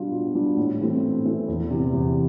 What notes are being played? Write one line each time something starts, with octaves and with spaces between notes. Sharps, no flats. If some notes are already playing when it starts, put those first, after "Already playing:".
Already playing: B2 G3 D4 F4
B2
G3 D4 F4
A2
E3 A3 C4
A2
E3 A3 C4
E2
C3 E3
E2